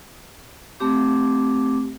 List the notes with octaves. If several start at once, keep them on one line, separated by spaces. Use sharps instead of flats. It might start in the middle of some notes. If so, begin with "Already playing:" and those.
A3 C4 G4 D6